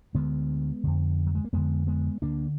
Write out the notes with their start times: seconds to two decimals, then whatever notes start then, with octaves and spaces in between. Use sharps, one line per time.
0.14 D2 D3 G#3 B3
0.84 F2 D3
1.27 F#3
1.35 G#3
1.45 A#3
1.53 F2 D3 G#3 B3
1.87 G#3 B3
2.22 D2 D3 A#3 D4